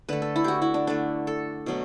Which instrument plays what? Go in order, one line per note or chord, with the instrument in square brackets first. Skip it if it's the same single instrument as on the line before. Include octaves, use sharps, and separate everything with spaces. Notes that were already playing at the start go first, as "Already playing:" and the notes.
[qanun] D3 A3 B4
A4
E4
F#4 G4
E4
D4
D3 A3 D4
A4
B2 F#3 A3